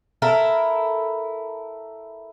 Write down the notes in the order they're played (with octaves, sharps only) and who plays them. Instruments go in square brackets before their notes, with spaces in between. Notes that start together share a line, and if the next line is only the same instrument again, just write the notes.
[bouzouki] E4 A4 A#4